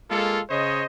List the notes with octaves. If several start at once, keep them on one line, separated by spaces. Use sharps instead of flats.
G#3 A#3 F4 A4
C#3 C5 C#5 D#5